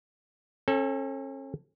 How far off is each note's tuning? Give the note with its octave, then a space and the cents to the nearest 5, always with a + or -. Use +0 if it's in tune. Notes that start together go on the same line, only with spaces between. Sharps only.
C#4 -40 A4 +5